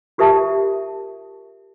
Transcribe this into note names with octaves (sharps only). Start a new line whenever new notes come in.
F4 G4 A#4 E5 A5